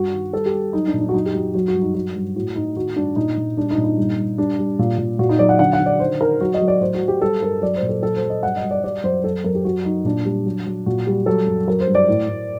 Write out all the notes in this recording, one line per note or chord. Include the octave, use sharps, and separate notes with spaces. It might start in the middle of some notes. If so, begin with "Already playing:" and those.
Already playing: G2 F#4
D#3
G3 A4
G4
G3
F#3 D#4
D4
A#2
D4
F#4
F#2 D#4
G4
F#2 F#4
F#3 F#4
F#4
G2
D#4
F#3 F#4
G2
A2 F#4
A2 D#4
D#3 F#4
G2 D4
A#2 D#4
A#2
G3 D4
D#4
A#2
D#4
G2
G2
G3 D4
G3
A#2
A#2
A#2 F#4
D#4
F#3 D5
F#5
D3 F#5
F#5
D3
D5
D#3 C5
D#3 A#4
F#3 F#4
D#5
F#3
D5
A2 C5
F#4
F#3
G4
G3 A4
G2 A#4
F#3 D5
C5
A#2
A4
F#3 A4
C5
F#3
D#5
G2 F#5
D#5
G2
D5
G3 D5
F#2 C5
F#3 A4
F#2 A#4
G4
F#2 F#4
F#3 D#4
A#2 D4
G3
F#3
F#3
A#2 F#4
G3
F#3 A4
F#2
F#3 A#4
C5
G2
D5
A2
A2